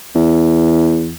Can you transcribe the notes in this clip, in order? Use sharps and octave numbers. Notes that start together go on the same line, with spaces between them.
E2